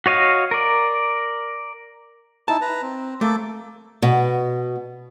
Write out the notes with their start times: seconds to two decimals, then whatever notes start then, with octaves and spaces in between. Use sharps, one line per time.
0.06 F#4 C#5 D#5 F5
0.51 A#4 D5
2.48 D#4 E4 A5
2.61 B4 A#5
2.82 C4
3.21 A3 A#3 A4 D6
4.02 B2